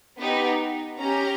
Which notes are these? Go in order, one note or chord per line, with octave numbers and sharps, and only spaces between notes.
B3 D#4 G4
C#4 G4 A#5